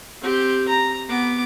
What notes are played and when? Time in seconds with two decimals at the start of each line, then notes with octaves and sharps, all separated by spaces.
0.22 C4 G4
0.68 A#5
1.09 B3 D6